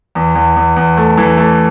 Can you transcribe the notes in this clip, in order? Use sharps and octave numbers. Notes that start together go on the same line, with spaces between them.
E2
E2
E2
E2
A3
E3
A3